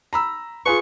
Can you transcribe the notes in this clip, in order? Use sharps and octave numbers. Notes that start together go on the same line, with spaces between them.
A#5 B5 E6
F4 G#4 B4 C#6